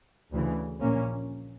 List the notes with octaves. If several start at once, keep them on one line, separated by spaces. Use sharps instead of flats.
D2 C#3 E3
A#1 A#2 A#3 C#4